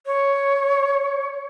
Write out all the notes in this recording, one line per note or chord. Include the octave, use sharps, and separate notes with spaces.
C#5